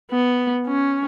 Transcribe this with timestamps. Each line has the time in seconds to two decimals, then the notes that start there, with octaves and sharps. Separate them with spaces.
0.11 B3
0.67 C#4